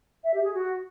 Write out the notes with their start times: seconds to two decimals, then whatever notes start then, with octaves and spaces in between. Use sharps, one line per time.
0.24 E5
0.34 G4
0.44 G#4
0.54 F#4